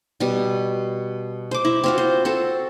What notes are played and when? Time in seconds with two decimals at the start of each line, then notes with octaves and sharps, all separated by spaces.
0.20 B2 G3
1.51 C5 D6
1.65 E4
1.84 C4 F4 F#4
1.98 C5
2.25 C4 F#4 A4